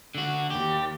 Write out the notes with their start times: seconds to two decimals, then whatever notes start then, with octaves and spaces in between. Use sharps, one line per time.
0.15 D3 F#4
0.51 D#2 G4